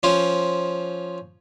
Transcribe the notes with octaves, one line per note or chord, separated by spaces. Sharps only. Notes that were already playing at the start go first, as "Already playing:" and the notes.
F3 C#4 C5